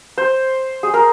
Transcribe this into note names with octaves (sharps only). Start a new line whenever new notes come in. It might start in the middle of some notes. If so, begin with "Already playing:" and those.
C5
G#4
A#4